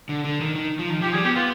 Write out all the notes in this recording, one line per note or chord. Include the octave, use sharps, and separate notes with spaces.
D3
D3
D#3
D#3
F3
D#3
F3 G4
G3 G#4
B3 G4
B3 F4